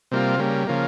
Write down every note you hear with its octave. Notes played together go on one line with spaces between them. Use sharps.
C3 G3 A#3 F4
C#3 G3 A#3
C#3 F3 A#3